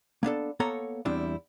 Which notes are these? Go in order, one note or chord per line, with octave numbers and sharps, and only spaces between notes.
A#3 B3 D4 A4
A#3 B3 A4 C#5 A#5
E2 G3 C4 D4 E4